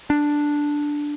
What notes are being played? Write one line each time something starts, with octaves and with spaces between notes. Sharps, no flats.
D4